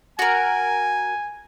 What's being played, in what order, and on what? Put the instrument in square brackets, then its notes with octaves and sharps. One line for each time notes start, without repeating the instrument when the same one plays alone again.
[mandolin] F#4 A#4 [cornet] G#5